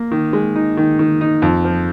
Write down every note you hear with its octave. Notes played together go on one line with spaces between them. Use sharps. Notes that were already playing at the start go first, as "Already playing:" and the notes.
Already playing: A#3
D#3
G#3
D#4
D#3
D#3
D#4
F2
F3